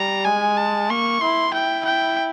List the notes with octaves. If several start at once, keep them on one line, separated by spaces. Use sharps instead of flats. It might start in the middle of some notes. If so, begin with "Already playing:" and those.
Already playing: G3 A#5
G#3 G#5
A5
A#3 C#6
E4 C6
E4 G5
G5